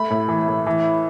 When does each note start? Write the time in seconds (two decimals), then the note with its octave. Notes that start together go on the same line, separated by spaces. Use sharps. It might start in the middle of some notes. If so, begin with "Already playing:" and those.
Already playing: A3 B5
0.10 A2
0.28 E3
0.48 A2
0.67 E3